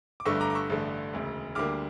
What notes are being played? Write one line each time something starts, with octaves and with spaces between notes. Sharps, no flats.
D6
G1 G2 D3 A3 C#6 E6
A#5 D6
D6
C#6 E6
A1 G2 D3 A3
E1 D2 C#3
D2 D3 G3 A#3 D6 F6